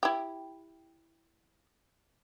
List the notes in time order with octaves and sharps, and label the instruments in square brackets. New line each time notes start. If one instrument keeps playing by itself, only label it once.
[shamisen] E4 G4